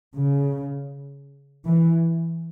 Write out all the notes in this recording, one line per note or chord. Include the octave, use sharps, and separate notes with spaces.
C#3
E3